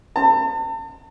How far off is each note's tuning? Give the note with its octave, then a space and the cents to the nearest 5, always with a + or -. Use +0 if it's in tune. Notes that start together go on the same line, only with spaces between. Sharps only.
A5 +40